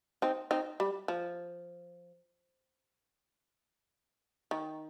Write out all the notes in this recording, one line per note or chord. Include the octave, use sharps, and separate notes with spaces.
C4 D#4
C4 D#4
G3
F3
D#3